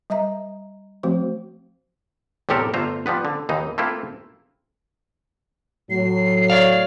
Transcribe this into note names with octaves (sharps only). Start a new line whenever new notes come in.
G3 D#5 E5 A#5
F3 A3 C4 F#4 C5
E2 A2 C3 G4 A4 A#4
G1 D3 A3 F4 C5 A#5
F3 G3 B3 B4
D3
D#2 E3 D#4
A3 A#3 C4 E4 F4
A2 F#3 C7
C#5 D5 F5